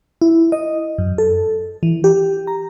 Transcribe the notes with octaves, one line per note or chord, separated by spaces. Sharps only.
E4
D#5
F#2
A4
E3
G4
A#5